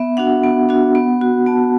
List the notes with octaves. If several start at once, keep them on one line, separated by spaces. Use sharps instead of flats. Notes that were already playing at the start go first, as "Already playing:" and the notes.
Already playing: B3 E5
D4 F#4 F#5
B3
D4 F#4
B3
F#4
B3 A5